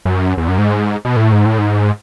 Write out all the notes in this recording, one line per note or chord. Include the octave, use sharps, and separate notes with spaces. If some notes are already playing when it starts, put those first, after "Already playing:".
F#2
E2
F#2
G#2
B2
A2
G#2
A2
G#2